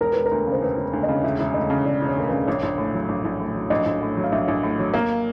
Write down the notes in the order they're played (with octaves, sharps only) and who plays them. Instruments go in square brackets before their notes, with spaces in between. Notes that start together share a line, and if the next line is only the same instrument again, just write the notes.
[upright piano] E1 [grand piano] A#4
[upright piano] E1 [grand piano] B4
[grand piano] A#4
[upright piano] D2
C#3
[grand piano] C5
[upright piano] E1 [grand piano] B4
[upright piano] E1
D2
[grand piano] D#5
[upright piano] C#3
[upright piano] E1 [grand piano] E5
[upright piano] E1 [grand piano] E5
[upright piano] D2 [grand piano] D#5
[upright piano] C#3
[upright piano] E1 [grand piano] D5
[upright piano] E1 [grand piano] C#5
[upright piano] D2 [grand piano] A#4
[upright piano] C#3 [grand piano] B4
[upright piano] A#1 [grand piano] C#5
[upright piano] A#1
A2
F#3
A#1
A#1
A2
F#3
[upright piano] A#1 [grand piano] D#5
[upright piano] A#1
A2
F#3
[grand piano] F5
[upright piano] A#1 [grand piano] E5
[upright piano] A#1
A2
F#3
[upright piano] A#3 [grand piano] F5